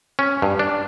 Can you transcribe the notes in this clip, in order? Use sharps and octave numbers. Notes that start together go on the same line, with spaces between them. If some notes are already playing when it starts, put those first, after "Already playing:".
C#4
G2
D4